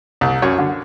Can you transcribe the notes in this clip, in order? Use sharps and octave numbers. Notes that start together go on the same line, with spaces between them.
C2
F#2 C#5
D3